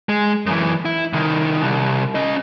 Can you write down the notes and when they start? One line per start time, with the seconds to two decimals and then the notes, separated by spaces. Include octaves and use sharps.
0.09 G#3
0.46 F#2 E3
0.85 E4
1.13 C2 D#3
1.61 C2
2.15 C#4 D#5